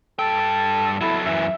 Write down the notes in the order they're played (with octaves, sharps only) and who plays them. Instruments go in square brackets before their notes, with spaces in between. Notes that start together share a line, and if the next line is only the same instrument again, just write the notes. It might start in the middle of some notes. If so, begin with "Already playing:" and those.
[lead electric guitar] G2 G5 [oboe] A4
[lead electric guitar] F#3 A4 [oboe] E4
[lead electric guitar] F#2 E3 [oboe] E5